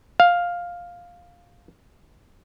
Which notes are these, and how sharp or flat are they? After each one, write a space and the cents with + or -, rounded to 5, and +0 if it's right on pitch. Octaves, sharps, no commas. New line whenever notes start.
F5 +5